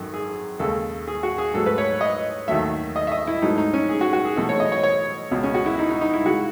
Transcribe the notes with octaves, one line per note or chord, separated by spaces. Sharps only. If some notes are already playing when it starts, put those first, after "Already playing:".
Already playing: G#1 F#2 D#3 A4
G#4
D#2 C#3 G#3 A4
G#4
F#4
G#4
G#2 F#3 A3 A4
B4
C#5
D#5
D#2 D#3 F#3 A3 E5
D#5
E5
D#5
E4
G#2 F#3 A3 D#4
D#4
C#4
G#4
F#4
F#4
G#4
E2 B2 F#3 A3 A4
C#5
D#5
C#5
C#5
C#2 B2 G#3
C#4
F#4
E4
D#4
D#4
D#4
E4
C#3 G#3 F#4